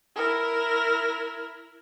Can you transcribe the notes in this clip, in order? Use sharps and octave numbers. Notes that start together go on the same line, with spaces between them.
E4 A#4